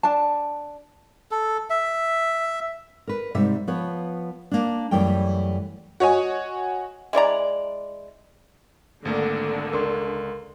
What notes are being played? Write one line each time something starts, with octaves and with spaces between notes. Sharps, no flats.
D4 A5
A4
E5
A#4 B4
G#2 C3 G3 E5
F3 B3 B4 C#5
A#3 D4
F#2 E3 G3 A3 G5
F#4 C#5 D#5 G#5
G#3 E4 D5 A#5
G#1 D3 A3 A#3
C#2 A#4 C6